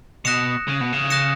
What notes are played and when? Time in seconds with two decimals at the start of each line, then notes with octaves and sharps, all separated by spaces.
0.25 B2 D#6 F#6 A#6 C#7 E7
0.68 C#3
0.81 B2
0.93 C#3
1.10 D#6 F#6 A#6 C#7 E7